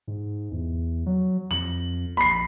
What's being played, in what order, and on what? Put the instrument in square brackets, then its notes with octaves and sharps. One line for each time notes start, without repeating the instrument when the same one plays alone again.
[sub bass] G#2
E2
F#3
[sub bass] F2 [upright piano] F#7
[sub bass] A#1 [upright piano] B5 C7